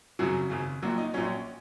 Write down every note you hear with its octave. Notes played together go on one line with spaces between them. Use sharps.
G#1 F#2 C#3 F#3 F#4
G#1 F#2 C#3
A#1 A#2 F#3 F#4
D#4 D#5
A#1 A#2 F#3 C#4 C#5